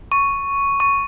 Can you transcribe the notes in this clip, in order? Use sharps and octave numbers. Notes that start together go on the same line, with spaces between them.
C#6
C#6